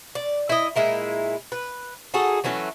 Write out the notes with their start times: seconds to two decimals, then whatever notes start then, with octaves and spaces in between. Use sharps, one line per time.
0.15 D5
0.49 E4 D#5
0.76 A#2 G#3 E4 A#4
1.52 B4
2.14 D#4 F#4 G#4 A4
2.44 E3 F#3 A3 C#4